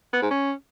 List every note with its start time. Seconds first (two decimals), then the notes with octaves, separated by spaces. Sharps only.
0.13 B3
0.22 G#2
0.31 C#4